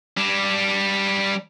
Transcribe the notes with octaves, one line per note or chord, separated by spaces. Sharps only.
G3 D4